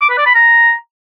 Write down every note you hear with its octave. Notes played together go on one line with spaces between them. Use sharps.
D6
B4
D5
B5
A#5